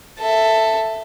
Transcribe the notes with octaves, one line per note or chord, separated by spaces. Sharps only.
A4 E5